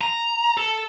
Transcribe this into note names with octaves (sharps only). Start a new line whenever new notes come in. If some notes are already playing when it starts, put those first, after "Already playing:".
A#5
A4